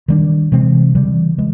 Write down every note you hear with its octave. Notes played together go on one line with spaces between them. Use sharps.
D#3 G3 B3 D4
C3 E3 G#3 C4
C#3 E3 G3
E3 G#3